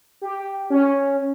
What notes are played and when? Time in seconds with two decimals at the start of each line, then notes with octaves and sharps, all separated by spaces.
0.22 G4
0.70 C#4